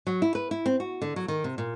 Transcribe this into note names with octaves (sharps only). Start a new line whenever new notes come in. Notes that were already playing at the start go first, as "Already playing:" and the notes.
F#3
E4
B4
E4
C4
F#4
D3
F#3
D#3
C3
A#2